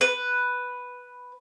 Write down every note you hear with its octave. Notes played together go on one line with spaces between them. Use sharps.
B4